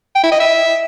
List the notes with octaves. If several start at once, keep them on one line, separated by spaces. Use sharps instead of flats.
G5
E4
D#5
E5